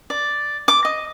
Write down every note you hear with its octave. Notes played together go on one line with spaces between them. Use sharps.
D5
D6
D#5